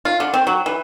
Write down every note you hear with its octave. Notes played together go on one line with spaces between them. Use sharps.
F4
D3
C4
F#3
E3